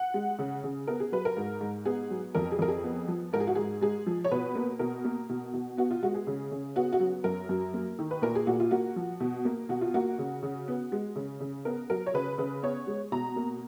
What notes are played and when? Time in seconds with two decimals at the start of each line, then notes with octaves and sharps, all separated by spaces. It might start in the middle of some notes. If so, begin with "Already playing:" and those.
Already playing: F#5
0.14 G#3
0.39 C#3
0.64 C#3
0.88 B3 A#4
1.00 G#4
1.12 F#3 B4
1.25 A#4
1.37 G#2
1.61 G#2
1.85 B3 G#4
2.10 F#3
2.35 F2 A#4
2.52 G#4
2.59 F2 A#4
2.68 G#4
2.84 B3
3.08 F3
3.33 G#2 A#4
3.40 G#4
3.47 F#4
3.55 G#2 G#4
3.82 G#3 G#4
4.06 F3
4.24 C#5
4.31 B2 B4
4.55 A#3
4.79 B2 A#4
5.05 A#3
5.29 B2
5.53 B2
5.77 B3 F#4
5.91 F4
6.03 G#3 F#4
6.14 G#4
6.27 C#3
6.51 C#3
6.76 B3 F#4
6.93 F#4
7.00 F#3
7.24 F#2 A#4
7.49 F#2
7.74 A#3
7.99 D#3
8.11 B4
8.22 A#2 A#4
8.35 G#4
8.47 A#2 F#4
8.60 F4
8.71 A#3 F#4
8.96 F3
9.20 B2
9.45 A#3
9.69 B2 F#4
9.81 F4
9.94 A#3 F#4
10.18 C#3
10.43 C#3
10.68 B3
10.92 G#3
11.16 C#3
11.40 C#3
11.65 B3 A#4
11.90 F#3 A#4
12.06 C#5
12.14 C#3 B4
12.38 C#3 B4
12.63 B3 C#5
12.87 G#3
13.12 B2 A#5
13.36 A#3